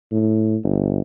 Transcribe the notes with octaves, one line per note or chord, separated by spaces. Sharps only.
A2
G1